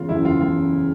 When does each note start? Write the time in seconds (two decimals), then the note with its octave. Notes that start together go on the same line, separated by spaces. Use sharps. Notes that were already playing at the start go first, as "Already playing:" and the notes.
Already playing: E2 C#3 F4
0.09 F#1 E4
0.25 F#1 F4
0.40 E2 F4
0.56 C#3